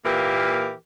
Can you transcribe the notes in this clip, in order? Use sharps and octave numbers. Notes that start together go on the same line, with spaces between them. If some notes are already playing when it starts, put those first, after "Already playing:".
A#2 E3 A#3 G4 A#4